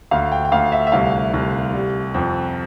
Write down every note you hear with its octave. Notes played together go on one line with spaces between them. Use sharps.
D2 F5
G5
G5
D2 F5
E5
E5
C2 F5
C2
G3
F2